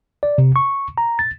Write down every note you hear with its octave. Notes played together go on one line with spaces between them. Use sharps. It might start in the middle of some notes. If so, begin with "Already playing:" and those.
D5
C3
C#6
A#5
A6